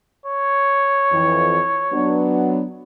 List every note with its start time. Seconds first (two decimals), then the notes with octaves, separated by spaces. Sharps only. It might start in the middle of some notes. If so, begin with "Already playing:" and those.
0.26 C#5
1.12 F2 E3
1.92 F#3 B3 D4